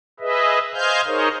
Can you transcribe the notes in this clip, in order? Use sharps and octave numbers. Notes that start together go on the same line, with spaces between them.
G#4 B4 D#5 E5
C5 D#5 F5 G#5 F6 G6
D#4 G#4 A#4 C5 C#5 D#5